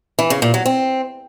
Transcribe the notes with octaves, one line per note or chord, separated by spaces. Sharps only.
E3
C#3
A#2
F#3
C4